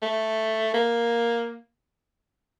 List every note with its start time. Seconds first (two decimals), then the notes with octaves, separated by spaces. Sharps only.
0.02 A3
0.74 A#3